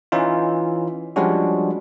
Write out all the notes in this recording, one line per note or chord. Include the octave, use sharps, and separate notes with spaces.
E3 C#4 D#4 F4
F3 G3 G#3 C#4 D4 F#4